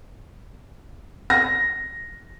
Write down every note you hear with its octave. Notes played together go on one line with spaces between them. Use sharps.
A#6